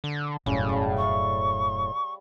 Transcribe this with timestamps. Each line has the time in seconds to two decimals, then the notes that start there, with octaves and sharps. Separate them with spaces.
0.04 D3
0.46 E1 F#2 A2 C#3 G3 C#4
0.69 D5 F5
0.97 C#6